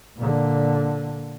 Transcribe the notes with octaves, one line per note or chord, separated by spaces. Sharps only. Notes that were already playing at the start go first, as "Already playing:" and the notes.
A#2 D3